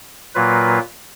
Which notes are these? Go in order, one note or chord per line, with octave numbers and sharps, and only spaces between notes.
A#2 F#3 A#3 F4 B4